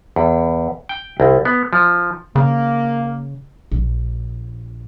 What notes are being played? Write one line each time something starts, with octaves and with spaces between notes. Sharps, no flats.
E2
G5
C2
B3
F3
C#3 A#3
A#1